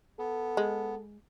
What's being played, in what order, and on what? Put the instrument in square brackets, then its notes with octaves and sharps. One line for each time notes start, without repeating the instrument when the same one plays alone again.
[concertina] B3 [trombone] A4
[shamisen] G#3